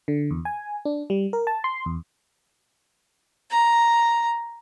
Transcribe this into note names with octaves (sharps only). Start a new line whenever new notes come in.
D3
E2
G#5
D4
G3
A#4
A5
C6
E2
A#5